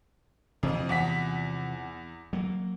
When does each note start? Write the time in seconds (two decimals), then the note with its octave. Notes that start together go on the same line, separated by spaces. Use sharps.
0.63 F2 C3 E3 F3
0.89 E2 F#5 B6
2.33 F#3 A#3